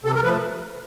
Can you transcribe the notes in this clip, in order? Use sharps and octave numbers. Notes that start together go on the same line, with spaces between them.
C3 A4
A#4
F3 A3 B4